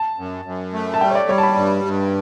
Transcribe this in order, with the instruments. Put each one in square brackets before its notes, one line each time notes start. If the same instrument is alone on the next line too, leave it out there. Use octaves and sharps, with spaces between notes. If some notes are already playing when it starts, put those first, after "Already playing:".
Already playing: [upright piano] A5
[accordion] F#2
F#2
A3
[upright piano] A5
[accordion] G3 [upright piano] G5
[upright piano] C#5
D5
[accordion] G3 [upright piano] C#5
[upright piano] A5
B5
[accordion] G2
G2